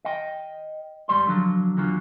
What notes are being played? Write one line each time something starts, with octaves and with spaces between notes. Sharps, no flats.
D#5 G5
G#2 E3 G3 D5 C6
D3 F3 F#3
E2 D3 F#3 F4